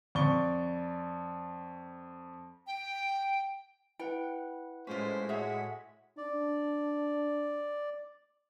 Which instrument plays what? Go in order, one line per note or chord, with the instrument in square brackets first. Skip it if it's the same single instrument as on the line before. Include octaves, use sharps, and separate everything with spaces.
[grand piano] F2 D5 C#6 G7
[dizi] G5
[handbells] E4 B4 F#5 [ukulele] G5
[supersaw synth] A2 G#3 B6 [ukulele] C#4 F4 [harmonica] C5
[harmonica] F#4 [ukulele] G#4 C#5 E5
[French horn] D4 [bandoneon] D5